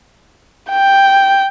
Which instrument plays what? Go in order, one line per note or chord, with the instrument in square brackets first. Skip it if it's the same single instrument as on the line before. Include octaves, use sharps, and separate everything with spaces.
[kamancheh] G5